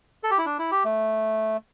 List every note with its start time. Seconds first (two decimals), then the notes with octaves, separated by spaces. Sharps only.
0.23 A4
0.31 G4
0.38 E4
0.45 D4
0.59 E4
0.71 G4
0.85 A3